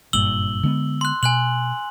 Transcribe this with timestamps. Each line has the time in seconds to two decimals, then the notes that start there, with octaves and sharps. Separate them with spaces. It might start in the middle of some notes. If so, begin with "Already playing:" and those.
0.13 F#1 G2 A#2 E6 F#7 G7
0.63 D3 G#3 B3
1.01 C6 F#6
1.23 B2 G#5 F#6 F#7